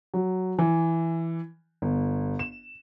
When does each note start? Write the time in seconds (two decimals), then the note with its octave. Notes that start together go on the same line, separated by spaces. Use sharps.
0.14 F#3
0.58 E3
1.82 G1
2.39 E7